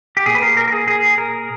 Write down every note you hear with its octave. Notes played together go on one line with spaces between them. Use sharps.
G4
A#2 G#4
B4
A#4
A#4
A#4
G#4
G#4
A#4